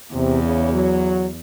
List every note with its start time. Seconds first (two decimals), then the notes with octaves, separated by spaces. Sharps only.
0.13 E2 C3
0.44 C#3
0.73 F#3